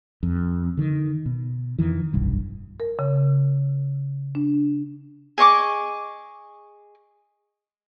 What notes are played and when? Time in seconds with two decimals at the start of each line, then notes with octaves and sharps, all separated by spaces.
0.23 F2
0.77 D3 D#3
1.26 B2
1.79 F2 D#3 E3
2.13 F1 B1 G2
2.80 A#4
2.99 C#3
4.35 D4
5.38 G#4 D#5 C#6 D6